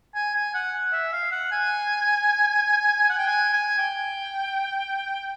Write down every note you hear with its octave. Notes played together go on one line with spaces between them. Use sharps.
G#5
G#5
F#5
E5
F5
F#5
G#5
F#5
G5
G#5
G#5
G5